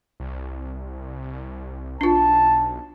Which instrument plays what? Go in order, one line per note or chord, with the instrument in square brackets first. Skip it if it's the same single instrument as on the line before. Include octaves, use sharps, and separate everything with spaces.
[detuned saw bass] C2
[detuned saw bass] B1 [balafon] D4 F4 [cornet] A5